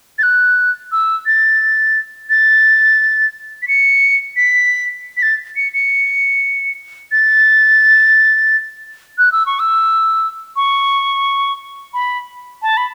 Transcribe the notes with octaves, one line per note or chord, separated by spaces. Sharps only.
A6
F#6
E6
A6
A6
B6
C#7
B6
B6
A6
C#7
C#7
A6
F#6
E6
C#6
E6
C#6
B5
A5
B5